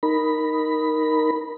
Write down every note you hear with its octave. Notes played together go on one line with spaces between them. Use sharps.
D#4 A#4 B5